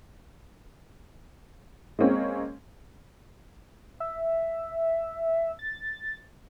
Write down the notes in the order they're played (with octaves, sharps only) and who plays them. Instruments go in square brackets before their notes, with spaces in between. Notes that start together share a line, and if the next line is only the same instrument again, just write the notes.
[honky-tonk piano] G#3 A#3 C4 C#4
[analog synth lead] E5
A6